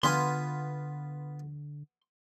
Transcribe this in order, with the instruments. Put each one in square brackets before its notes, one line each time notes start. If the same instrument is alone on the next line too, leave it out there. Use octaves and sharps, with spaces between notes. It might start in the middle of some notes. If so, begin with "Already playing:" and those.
[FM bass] D3 [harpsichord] B3 F4 G#5 [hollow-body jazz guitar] C6